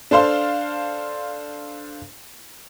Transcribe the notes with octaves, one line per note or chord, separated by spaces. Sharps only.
D4 A4 C5 F5 C6